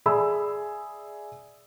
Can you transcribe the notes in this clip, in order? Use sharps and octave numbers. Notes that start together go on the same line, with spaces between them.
G#4 D5 E5 G#5 B5 E6